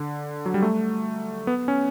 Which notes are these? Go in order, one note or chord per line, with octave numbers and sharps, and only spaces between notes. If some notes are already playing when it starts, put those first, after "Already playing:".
Already playing: D3
F#3
G3
A3
B3
C#4